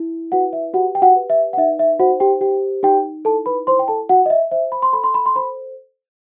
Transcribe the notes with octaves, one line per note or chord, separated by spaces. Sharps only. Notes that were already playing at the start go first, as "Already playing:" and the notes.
Already playing: E4
F#4 B4 F#5
E5
F#4 G4 F#5
G5
F#4 F#5
B4
E5
F#5
D#4 E5
E5
F#4 C5 F#5
G4 G5
G4 G5
D#4 G4 G5
E4 A4 A5
B4 B5
E4 C5 C6
G5
A4 A5
F#4 F#5
D#5
E5
C5 E5
B5
C6
A4 B5
C6
B5
C6
C5 B5